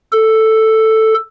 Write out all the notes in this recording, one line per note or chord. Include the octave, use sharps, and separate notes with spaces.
A4